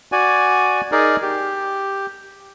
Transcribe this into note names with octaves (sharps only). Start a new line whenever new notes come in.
F#4 D5 G#5
D#4 G#4 A#4 D5
G4